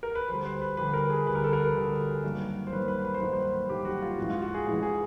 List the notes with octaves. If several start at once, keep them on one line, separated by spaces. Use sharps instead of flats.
A#4
B4
D2 D3 G3 C5
C5
B4
D2 D3 G3 B4
A#4
G#4
D2 D3 G3 B4
A#4
A4
A#4
D2 D3 G3
G2 D#3 F#3 A#3
C5
G2 D#3 F#3 A#3 B4
B4
B4
C5
G2 D#3 F#3 A#3 B4
C5
B4
G2 D#3 F#3 A#3 G4
F#4
F4
A1 G#2 E3 F#4
F4
F#4
G#4
A1 G#2 E3 G#4
G#4